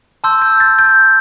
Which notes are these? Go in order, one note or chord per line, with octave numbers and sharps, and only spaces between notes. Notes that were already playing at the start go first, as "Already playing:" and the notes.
A5 C6 E6 G6
G6
A6
G6